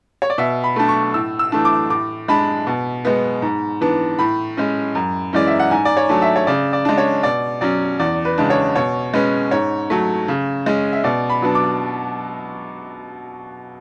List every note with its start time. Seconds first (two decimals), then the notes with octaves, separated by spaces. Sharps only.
0.22 C#5
0.30 D5
0.38 B2 E5
0.64 B5
0.76 A3 D4
0.89 C#6
1.14 A2 E6
1.39 E6
1.52 E3 A3 D4
1.65 D6
1.90 A2 D6
2.28 G#3 D4 B5
2.67 B2
3.05 G#3 B3
3.42 G#2
3.81 E3 B3 D4
4.19 A2 B5
4.57 G#3 C#4
4.95 F#2
5.33 E3 G#3 C#4 D5
5.47 E5
5.60 F#5
5.71 G#2 G#5
5.85 D5
5.97 C#5
6.09 F#3 A3 D4
6.22 E5
6.36 C#5
6.47 C#3 D5
6.73 D5
6.85 G#3 D4
6.98 C#5
7.23 B2 D5
7.61 F#3 C#4 D5
7.99 E2 D5
8.25 B4
8.38 C#3 G#3 D4
8.50 C#5
8.76 B2 C#5
9.14 G#3 C#4 B4
9.51 G#2 C#5
9.90 F#3 A3
10.28 C#3
10.66 G#3 C#4
10.93 E5
11.04 B2 D5
11.29 B5
11.42 F#3 B3 D4
11.55 D6